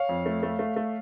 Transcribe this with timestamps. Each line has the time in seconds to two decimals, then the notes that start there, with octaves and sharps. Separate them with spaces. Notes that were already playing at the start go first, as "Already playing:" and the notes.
Already playing: C#5 F5
0.09 F2
0.26 A3
0.43 A3
0.59 A3
0.76 A3